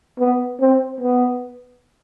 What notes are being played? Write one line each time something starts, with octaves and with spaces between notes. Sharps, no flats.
B3
C4
B3